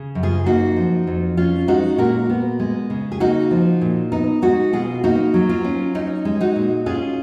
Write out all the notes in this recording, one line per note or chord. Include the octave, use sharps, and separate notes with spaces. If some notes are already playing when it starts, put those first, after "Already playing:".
Already playing: C#3
F#2
F4 G#4
A#3 D#4 F#4
F3
F2
C#4 F4
G#3 D#4 F#4
A#2 F#4 A#4
B3
G#3
C#3
G#4
A#3 D#4 F#4
F3
A#2
B3 D#4
G#3 D#4 F#4
B2 F4 G#4
A#3 D#4 F#4
F#3
F4
C#4
C#4 D#4
G#3
D#4 F#4
A#2
C#4 F4 G#4